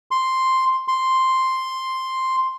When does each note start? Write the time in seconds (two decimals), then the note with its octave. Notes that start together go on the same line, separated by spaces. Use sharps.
0.11 C6
0.88 C6